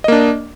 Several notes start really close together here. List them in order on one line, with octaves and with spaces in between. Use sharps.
D#5 A#3 D4